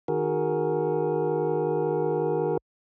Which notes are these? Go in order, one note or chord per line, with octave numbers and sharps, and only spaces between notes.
D#3 F#4 G#4 A#4